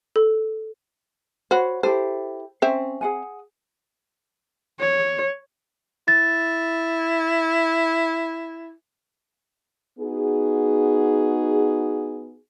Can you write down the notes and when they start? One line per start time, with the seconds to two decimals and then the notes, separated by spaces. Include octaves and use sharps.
0.16 A4
1.51 F#4 C5 C#5 F#5 B5
1.83 E4 G4 A4 C5
2.62 C4 C#4 C5 E5
3.01 G#4 F#5 G#5
4.80 C#5
6.08 E4 A6
9.99 B3 D#4 F#4 G#4